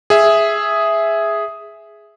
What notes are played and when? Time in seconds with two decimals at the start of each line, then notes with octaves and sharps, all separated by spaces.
0.10 G#4 E5